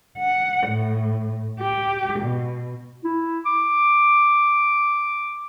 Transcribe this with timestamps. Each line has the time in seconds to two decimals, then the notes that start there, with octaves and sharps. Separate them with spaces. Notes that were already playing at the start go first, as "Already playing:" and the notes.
0.19 F#5
0.67 A2
1.60 G4
2.19 B2
3.04 E4
3.46 D6